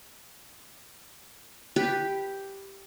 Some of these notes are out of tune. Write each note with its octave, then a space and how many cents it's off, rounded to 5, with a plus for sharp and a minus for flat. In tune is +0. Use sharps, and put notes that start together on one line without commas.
G4 +0 B4 +0